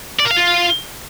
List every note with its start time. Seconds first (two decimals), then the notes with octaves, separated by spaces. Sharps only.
0.19 D5
0.25 A#4
0.31 F5
0.37 F4